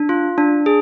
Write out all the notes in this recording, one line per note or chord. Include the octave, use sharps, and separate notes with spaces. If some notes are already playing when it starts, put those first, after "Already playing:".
Already playing: D4
F4
D4
G#4